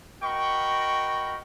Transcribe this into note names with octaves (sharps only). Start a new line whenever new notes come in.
F#4 A#4 D#5 G5 B5 C#6